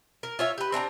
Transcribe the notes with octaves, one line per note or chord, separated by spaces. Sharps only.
A#4
F4 C#5 E5
G4 B4
C4 D4 F#5 A#5